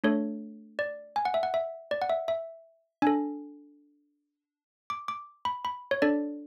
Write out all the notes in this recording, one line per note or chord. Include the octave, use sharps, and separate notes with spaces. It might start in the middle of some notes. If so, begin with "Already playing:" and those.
A3 D4 A4 C#5
D5
G#5
F#5
E5
F#5
E5
D5
F#5
E5
E5
D4 A4 G#5
D6
D6
B5
B5
C#5
D4 A4 D5